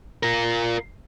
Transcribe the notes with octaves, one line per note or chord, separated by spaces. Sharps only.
F4 A#4